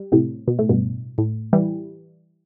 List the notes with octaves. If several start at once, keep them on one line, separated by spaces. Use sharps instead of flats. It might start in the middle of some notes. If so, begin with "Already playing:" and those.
Already playing: G3
A2 C3
B2
A2
G2 B2
A2
E3 G3